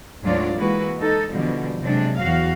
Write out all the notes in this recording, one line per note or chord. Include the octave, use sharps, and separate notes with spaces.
D2 G#2 F#3 D4 F4 D5
E3 G#3 A#3 E4 F#4 B4
D#4 A4
B2 D3 E3 F3 G3
C3 F#3 G#3 D4
E2 F#4 F5